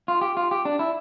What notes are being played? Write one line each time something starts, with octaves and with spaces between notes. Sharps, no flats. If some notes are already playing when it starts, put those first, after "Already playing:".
F4
G4
F4
G4
D4
E4